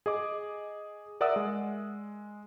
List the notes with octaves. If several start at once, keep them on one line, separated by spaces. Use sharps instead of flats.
G#4 D#5 D6
A#4 D5 E5 F#5 D#6 E6
G#3